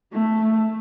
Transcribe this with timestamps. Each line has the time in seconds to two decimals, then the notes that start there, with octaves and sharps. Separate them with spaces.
0.13 A3